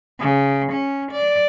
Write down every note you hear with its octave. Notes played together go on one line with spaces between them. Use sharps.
C#3
C#4
D5